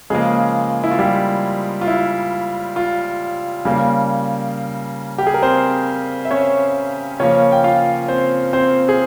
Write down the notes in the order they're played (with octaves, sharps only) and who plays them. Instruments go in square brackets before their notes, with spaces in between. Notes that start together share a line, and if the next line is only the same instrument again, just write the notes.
[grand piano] C#3 F3 G#3 A#3 G#4
E4
F4
G3 G4
F4
E4
F4
C#3 G3 A#3
G4
G#4
A#4
C4 C5
E5
C#4 C#5
C#3 F3 A#3 C#4 C#5
G5
F4 F5
C4 C5
C4 C5
G#4